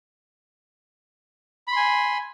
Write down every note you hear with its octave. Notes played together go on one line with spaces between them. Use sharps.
G#5 B5 C6